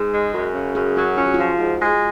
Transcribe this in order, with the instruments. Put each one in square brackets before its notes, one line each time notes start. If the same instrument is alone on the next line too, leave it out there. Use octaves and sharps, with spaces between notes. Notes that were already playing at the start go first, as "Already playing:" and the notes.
Already playing: [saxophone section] G#2 [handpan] G#4
[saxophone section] G#3
[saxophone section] F#2 [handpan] F#4
[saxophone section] C#3
[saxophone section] F#2 [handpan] G#4
[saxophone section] F#3 [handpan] F#4
[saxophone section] C#4 [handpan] F4
[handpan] F#4
[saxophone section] F3 [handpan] F4
[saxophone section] G#2
G#3